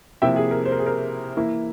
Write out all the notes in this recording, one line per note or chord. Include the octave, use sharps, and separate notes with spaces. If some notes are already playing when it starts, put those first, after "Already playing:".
C3 F3 A#3 E4 E5 G5
G#4
A#4
C5
A#4
G#4
A#4
E3 A#3 E4